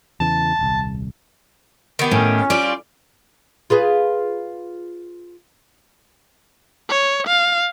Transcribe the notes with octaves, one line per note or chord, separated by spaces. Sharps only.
E2 C#3 E3 A5
D#1 C2
D#3 B3 G4
A2 C#4
G3 F4 D5
F4 G#4 B4
C#5
F5